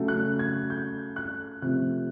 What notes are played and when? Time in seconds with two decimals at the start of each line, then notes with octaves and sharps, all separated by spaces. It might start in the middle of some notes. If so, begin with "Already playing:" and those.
Already playing: C#3 F#3 A3
0.08 F#6
0.39 G#6
0.70 G6
1.16 F#6
1.62 C3 F3 A3 F#6